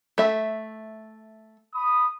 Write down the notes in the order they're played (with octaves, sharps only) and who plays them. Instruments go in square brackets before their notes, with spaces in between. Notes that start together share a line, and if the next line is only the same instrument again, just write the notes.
[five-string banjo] A3 E5
[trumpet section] B5 D#6